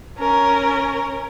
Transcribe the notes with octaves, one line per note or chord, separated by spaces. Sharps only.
C#4 A#4